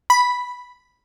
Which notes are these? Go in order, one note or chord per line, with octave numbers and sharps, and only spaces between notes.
B5